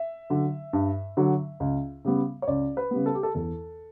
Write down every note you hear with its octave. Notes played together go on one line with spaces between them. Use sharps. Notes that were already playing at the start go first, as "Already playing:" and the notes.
Already playing: E5
D3 F#3
G2
D3 F#3
C#2
C#3 G3 B3
C#5
C#2 D5
B4
C#3 G3 B3
A4
G4
A4
E2 A4